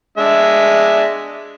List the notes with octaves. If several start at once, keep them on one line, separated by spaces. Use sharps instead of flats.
G#3 D4 E5